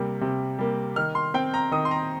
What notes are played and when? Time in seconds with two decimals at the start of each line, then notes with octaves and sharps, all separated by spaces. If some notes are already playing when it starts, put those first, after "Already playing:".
Already playing: C3 G3 A#3
0.21 C3
0.59 G3 A#3
0.96 D#3 F6
1.15 C6
1.34 C4 G5
1.54 A#5
1.71 D#3 D#6
1.85 C6
1.91 A#5